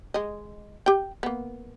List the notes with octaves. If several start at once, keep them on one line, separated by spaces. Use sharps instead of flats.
G#3 D#5
G4 G5
A#3 B3